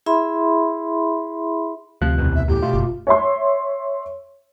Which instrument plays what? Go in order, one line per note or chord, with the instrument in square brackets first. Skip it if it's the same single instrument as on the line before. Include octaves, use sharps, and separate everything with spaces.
[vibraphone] E4 G#4 E5 B5 C6
[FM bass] D2 [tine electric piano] C3 F#6 [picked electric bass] F3
[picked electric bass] A1 E2 B2
[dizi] E5
[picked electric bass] E2 A2 [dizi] G4
[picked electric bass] B2 A3 [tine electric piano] F4
[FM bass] F#1
[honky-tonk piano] C#5 E5 C6